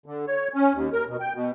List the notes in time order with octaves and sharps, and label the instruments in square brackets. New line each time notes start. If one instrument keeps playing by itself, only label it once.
[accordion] D3
C#5
C#4
D#2
A#4
B2
G5
B2